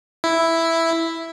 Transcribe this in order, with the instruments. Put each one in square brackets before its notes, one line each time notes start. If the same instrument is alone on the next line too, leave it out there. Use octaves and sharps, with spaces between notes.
[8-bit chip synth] E4